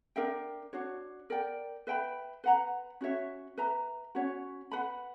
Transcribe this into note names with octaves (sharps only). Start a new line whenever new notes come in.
D4 A#4 E5 G5
D4 F#4 C#5
A#4 D5 G5
B4 E5 G5 B5
B4 F#5 A#5
C#4 F#4 C#5 E5
B4 E5 A#5
C#4 F#4 C#5
B4 F#5 B5